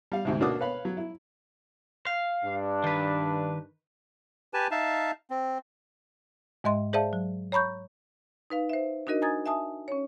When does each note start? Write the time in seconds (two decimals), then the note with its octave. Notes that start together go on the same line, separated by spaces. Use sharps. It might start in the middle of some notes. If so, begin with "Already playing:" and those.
0.12 G3 F5
0.25 D2 G#2 C3
0.41 B2 A#3 D4 F#4 D6 D#6
0.61 B4 C#5 F5 B5
0.85 F#3
0.97 E4
2.07 F5
2.44 G2 D4
2.84 D#3 B4
4.54 G4 B4 G#5 A5
4.71 D#4 E5 F5 A5
5.31 C4
6.64 G#2 G#3 D#5 E5 C6
6.93 G#4 C5 D5 E5 F5 A5
7.13 F#3
7.52 C#5 A#5 B5 C#6 G6
8.50 D#4 B4 F5
8.69 C5 E5
9.07 D4 D#4 F#4 A#4 D#5
9.22 G#5 A#5 D#6 G#6 A6
9.46 E5 G#5 A5 D#6
9.88 C#4 C#5